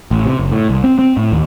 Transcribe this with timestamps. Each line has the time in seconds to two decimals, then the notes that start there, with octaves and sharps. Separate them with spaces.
0.11 A1
0.26 C3
0.39 F#1
0.52 A2
0.69 C2
0.84 C4
0.99 C4
1.17 A2
1.32 D#2